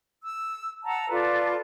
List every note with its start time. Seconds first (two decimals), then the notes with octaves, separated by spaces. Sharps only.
0.23 E6
0.85 F#5 A5 A#5 E6
1.10 F4 A4 B4 D5